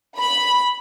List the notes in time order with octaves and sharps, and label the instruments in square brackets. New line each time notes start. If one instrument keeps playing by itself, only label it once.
[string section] B5